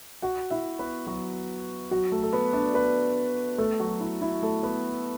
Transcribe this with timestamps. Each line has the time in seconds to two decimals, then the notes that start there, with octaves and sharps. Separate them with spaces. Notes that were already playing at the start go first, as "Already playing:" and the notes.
0.22 F#4 F#5
0.51 E4 E5
0.79 B3 B4
1.07 F#3 F#4
1.91 F#3 F#4
2.12 A3 A4
2.23 A4
2.33 B3 B4
2.53 D4 D5
2.74 B3 B4
3.58 A3 A4
3.80 F#3 F#4
4.00 E4
4.22 E4
4.43 A3 A4
4.63 B3 B4